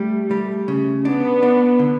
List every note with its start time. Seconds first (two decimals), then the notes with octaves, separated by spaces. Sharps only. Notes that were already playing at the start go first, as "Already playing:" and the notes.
Already playing: G3 A3
0.31 G3
0.68 C#3
1.05 B3 D4
1.43 D4
1.79 D3